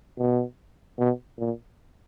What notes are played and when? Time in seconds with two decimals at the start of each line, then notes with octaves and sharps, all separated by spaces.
0.18 B2
0.99 B2
1.39 A#2